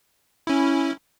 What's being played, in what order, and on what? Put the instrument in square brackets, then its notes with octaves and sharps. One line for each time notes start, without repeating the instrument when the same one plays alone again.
[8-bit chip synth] C#4 E4